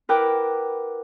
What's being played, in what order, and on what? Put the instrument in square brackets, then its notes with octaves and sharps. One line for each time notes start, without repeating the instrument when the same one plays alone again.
[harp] E4 A#4 B4 F#5 G5 D6